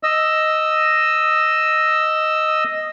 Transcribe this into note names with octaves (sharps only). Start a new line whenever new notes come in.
D#5 E6